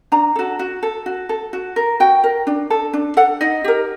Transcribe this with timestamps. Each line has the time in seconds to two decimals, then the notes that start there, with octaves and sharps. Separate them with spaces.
0.12 D4 A#5
0.36 F#4 A4
0.59 F#4
0.83 A4
1.06 F#4
1.29 A4
1.53 F#4
1.76 A#4
2.00 F#4 G5
2.24 A#4
2.47 D4
2.70 A4
2.93 D4
3.17 A4 F#5
3.41 D#4 D#5
3.64 G4 A#4